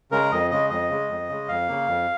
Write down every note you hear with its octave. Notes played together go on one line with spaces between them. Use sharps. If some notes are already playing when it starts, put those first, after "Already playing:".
C#3 G#3 A#4
F2 D#5
C#3 G#3 D#5
F2 D#5
C#3 G#3
F2
C#3 G#3
F2 F5
C#3 A#3
F2